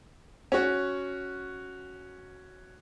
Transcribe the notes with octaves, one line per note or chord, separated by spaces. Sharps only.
C#4 F#4